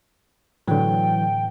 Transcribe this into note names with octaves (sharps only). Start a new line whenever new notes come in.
A2 D3 E3 F#3 G5